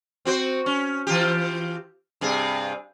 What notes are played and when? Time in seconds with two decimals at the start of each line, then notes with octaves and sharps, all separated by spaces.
0.25 C4 F#4 C5
0.66 C#4
1.07 E3 F4 G4
2.21 G2 C3 G#4